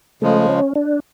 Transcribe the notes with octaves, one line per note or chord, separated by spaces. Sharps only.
C#3 F3 G#3 A3
C#4
D4